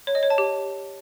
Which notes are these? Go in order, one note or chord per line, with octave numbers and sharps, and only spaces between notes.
C#5
D#5
C#5
A5
G4